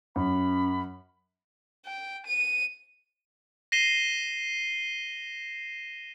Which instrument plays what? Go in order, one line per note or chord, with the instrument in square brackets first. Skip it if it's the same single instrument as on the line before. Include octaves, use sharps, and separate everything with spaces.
[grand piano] F#2 [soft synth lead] C#4 [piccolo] B5
[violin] G5
D#7
[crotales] A#6 C7 D#7 E7 G7